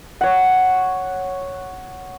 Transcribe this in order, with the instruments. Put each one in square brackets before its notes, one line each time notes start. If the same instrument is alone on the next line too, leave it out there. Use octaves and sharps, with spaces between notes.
[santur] C#5 F#5